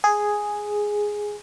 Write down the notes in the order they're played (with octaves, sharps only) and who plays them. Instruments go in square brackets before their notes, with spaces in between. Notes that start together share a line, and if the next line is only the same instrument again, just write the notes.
[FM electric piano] G#4